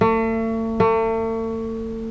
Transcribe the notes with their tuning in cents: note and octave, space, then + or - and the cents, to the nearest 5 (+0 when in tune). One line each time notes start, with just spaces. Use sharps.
A3 +40
A3 +40